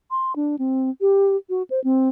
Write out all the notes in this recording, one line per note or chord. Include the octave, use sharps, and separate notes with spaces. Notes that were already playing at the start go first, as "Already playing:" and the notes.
C6
D4
C4
G4
F#4
C5
C4